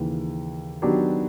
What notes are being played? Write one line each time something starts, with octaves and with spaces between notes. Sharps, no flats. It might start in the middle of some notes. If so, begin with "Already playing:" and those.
Already playing: D#2 C#3 E3
D#3 F#3 B3 D4 G4